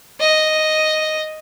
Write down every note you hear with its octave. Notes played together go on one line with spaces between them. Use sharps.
D#5